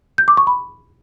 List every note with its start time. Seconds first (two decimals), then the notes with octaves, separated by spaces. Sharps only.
0.18 G6
0.28 D6
0.37 C#6
0.47 B5